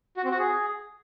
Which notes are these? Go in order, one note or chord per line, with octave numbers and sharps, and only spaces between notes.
F#4
C4
F#4
G#4